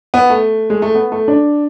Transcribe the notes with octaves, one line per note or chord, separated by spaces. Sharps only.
B3
A3
G#3
A3
B3
A3
D4